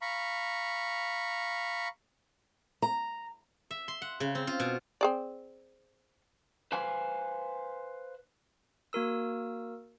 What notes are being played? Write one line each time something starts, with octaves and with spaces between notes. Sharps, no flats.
F5 A#5 B5 C#6
A#5
E5
C6
F#5
C#3
C4
F4
B2
C4 G#4 D5
B4 C5 F5 G#5
A#3 F#4 A#4 E6